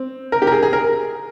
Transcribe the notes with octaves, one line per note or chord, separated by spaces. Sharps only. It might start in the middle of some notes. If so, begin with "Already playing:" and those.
Already playing: C4
A#4
G4
A#4
G#4
G#4
A#4